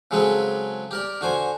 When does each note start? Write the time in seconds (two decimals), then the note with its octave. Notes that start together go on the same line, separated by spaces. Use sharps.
0.11 C#3 F#3 G#3 C4 A4 B4
0.91 G4 A#4 D5
1.21 D3 F#4 C5 G#5